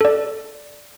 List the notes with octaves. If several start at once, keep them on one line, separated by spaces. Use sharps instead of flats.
A4 D5